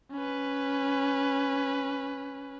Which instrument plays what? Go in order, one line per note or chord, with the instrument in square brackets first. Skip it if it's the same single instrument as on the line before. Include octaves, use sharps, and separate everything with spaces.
[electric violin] C#4 B4